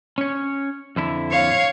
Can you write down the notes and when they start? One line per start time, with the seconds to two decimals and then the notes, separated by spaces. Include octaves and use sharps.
0.18 C#4 C#5
0.96 F2 D3 E4
1.31 C#5 F5